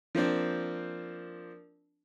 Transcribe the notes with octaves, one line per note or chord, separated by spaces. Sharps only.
F3 A#3 C4 D4